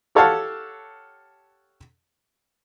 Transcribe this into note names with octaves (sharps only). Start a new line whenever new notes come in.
G4 A4 C#5 F5 F#5 A5